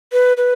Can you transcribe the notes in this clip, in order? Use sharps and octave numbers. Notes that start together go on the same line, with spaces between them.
B4
B4